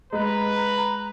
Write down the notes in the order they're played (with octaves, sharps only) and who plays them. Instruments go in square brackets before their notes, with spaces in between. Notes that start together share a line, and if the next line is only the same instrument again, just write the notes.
[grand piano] G#3 [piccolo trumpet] B4 [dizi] A#5